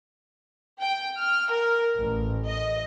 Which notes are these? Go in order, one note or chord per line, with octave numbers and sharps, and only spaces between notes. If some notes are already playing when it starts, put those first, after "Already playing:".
G5
F6
A#4
A1
D#5